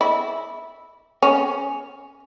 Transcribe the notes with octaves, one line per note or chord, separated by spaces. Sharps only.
E4
C#4